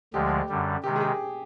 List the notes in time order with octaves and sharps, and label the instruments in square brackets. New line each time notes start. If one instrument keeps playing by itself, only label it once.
[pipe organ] D2 D3 F3 G#3 [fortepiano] G4
[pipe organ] F#2 D3 G3
[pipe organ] C3 D#3 G#3 [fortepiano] G4
[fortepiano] G#4
G4